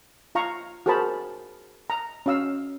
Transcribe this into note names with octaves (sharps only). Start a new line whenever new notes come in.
F4 F5 A#5 C#6
F#4 G#4 A#4 C5 A5 B5
A#5
C#4 F#4 F5 E6